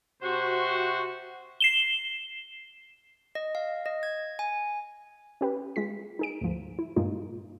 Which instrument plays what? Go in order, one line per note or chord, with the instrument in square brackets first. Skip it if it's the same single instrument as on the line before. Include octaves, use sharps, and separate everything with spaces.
[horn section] C3 F#4 C5
[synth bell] C7 E7 G7
[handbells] D#5
F5
D#5
G#6
G#5
[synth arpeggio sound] C#4 G4 B4
G#3 F4 B6
D#4 G#4 D7
D2 G#2 F3
E4
G2 A#2 G#3 A#3 D#4 F4